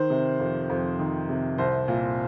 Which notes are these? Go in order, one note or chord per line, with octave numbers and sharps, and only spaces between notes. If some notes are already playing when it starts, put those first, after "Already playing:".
Already playing: D#3 C5
C3
F2
F2
D#3
C3
C2 C5
A#2